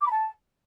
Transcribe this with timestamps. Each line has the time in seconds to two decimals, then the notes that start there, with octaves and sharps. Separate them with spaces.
0.01 D6
0.06 B5
0.11 A5